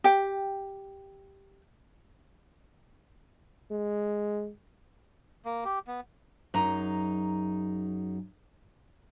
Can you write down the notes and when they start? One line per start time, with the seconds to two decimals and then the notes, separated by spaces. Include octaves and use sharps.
0.04 G4 G5
3.71 G#3
5.45 A#3
5.65 G4
5.87 B3
6.54 F#2 D#4 G#4 A#5